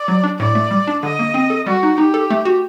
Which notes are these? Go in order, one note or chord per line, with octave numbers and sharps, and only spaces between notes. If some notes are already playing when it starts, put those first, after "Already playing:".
Already playing: D5
F#3
D4
A2 D5
A3
G3
D4
D3 D#5
A#3
C4
A4
G3 F#4
D#4
D#4 G4
A4
A3
F#4